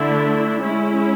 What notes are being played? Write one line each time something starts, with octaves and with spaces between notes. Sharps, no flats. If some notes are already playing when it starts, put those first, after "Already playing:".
Already playing: D3 A3 D4 E4
G#3 C#4 E4